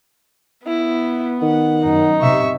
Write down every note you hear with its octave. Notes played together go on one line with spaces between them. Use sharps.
B3 E4
D#3 F#5
F#2 D#4
C3 E5 C#6